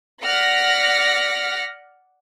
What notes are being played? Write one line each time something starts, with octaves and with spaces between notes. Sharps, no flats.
D5 F#5 F6 A#6 B6